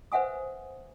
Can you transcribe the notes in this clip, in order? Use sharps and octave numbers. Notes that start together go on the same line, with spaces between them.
B4 C5 E5 F#5 G#5 D#6